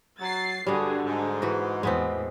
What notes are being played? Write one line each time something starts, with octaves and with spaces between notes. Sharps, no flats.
F#3 A6 C7
G2 D3 G3 F#4 G#4
G#2
E3 F#4
E2 A2 G#3 B3 C4